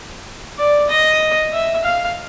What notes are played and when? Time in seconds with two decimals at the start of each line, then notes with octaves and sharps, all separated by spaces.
0.58 D5
0.89 D#5
1.53 E5
1.85 F5